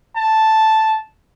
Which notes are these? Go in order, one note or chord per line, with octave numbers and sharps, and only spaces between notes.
A5